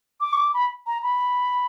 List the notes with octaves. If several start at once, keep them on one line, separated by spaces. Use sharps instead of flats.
D6
C#6
D6
B5
A#5
B5